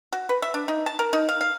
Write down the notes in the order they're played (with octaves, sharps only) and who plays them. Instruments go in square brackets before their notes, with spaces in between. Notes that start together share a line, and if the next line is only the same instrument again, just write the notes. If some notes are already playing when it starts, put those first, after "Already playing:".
[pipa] F#4
B4
E5
D4
D#4
A5
A#4
D#4
F5
F5